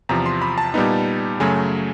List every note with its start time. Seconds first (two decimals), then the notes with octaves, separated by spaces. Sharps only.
0.09 E2 C3 F3 A#5
0.26 C6
0.42 B5
0.58 A5
0.74 A#2 G3 B3 D#4
1.40 F#2 C#3 F#3 A3 G#5